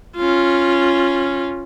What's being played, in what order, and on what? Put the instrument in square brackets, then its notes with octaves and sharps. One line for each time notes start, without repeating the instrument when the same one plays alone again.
[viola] C#4 F4